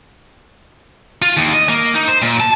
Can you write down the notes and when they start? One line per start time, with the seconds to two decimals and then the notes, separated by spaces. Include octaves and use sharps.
1.22 F4
1.37 D#2
1.54 D#5
1.69 A#3
1.94 D#4
2.08 C5
2.22 A#2
2.40 A5